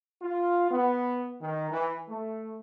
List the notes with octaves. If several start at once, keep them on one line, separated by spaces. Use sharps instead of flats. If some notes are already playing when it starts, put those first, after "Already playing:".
F4
B3
D#3
E3
A3